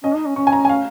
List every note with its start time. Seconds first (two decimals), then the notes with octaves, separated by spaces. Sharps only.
0.04 C#4 D#5
0.15 D#4
0.26 C#4
0.36 C#4 C#6
0.47 G#5
0.53 A#5
0.65 G#5
0.69 F5